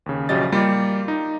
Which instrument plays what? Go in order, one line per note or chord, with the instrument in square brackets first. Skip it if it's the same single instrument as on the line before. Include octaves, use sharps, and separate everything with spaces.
[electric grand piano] D#2 C#3
A#1 C#3 F#3 G4 D#5 A6
G3 A#3 F4 G4
D#4